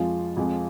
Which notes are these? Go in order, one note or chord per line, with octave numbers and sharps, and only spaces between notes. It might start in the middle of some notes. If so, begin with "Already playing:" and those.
Already playing: F2 F3 G#3 F4
F2 F3 G#3